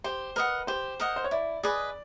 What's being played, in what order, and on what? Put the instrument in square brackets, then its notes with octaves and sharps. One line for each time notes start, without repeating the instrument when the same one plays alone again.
[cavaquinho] G4 [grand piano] C5
[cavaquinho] A#4 D#5 F#5 [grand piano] B4
[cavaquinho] G4 [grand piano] C5
[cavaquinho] A#4 D#5 F#5
[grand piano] C5
C#5
[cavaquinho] E4 [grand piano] D5
[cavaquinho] G#4 B4 D#5 [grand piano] D5